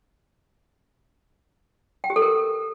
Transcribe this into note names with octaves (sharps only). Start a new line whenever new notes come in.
G5
G4
A4
A#4